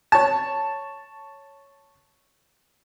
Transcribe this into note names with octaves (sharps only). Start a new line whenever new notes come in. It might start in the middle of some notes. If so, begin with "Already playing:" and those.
C#5 A5